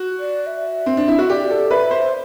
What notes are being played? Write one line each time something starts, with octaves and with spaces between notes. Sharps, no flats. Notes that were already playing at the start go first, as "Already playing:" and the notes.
Already playing: F#4
D5
E5
C4
D4
E4
F#4
G4 D5
A4
B4 E5
C5